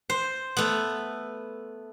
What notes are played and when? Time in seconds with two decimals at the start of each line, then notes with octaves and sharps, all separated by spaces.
0.10 C5
0.57 A3 B3